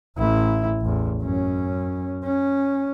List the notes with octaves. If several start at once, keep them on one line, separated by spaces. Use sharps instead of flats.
A1 E4
A1 E2
F#2 C#4
C#4